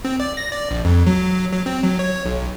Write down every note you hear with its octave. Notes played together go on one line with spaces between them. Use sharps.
C4
D5
A#6
D5
A#1
F2
F#3
F#3
C4
F#3
C#5
B1